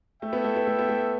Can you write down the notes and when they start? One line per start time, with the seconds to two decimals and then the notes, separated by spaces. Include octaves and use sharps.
0.22 A3 E4 A4 E5 G5
0.33 B3
0.44 A3
0.56 B3
0.67 A3
0.79 B3
0.89 A3